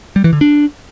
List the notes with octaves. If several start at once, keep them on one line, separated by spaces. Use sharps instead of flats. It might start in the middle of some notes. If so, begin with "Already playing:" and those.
G3
E3
D3
D4